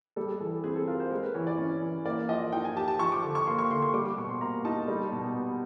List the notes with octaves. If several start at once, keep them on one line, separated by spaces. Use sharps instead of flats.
G3 A4
G#4
E3 A4
A4
C4 G#4
A4
F4 A#4
C5
G#3 A#4
B4
E3 C#5
D5
C#4
E3
A#3 D5
F3 D#5
D#4 G5
G#5
G4 A5
A5
F3 C#6
D6
D3
C#6
A#3 C6
C#6
D3 C6
C#6
G3 D6
D6
B2 C#6
C6
A#3 A#5
D#4 A5
G3
B2
B3